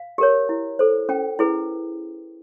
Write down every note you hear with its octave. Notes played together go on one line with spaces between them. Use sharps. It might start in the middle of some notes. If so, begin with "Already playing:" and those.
Already playing: F5
G4 A#4 C#5
E4
A4 C5
C#4 G5
E4 G#4 B4